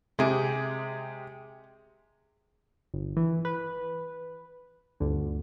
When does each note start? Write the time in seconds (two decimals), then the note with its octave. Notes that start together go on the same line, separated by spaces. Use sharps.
0.19 C3 G#3 G4 G#4
2.94 G1
3.17 E3
3.45 B4
5.00 G1 D2 D3